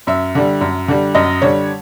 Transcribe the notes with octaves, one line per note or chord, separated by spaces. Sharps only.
F#2 E5
D3 G3
F#2
D3 G3
F#2 D#5
D3 G3 C#5